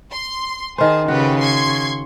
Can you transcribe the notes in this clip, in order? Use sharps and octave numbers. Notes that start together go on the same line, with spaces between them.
C6
D#3 G#4 C5 A5
C#3 F#4 G4 B4
C6 C#6 G#6